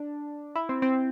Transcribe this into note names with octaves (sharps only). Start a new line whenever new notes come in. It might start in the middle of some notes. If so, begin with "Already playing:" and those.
Already playing: D4
E4
C4
C4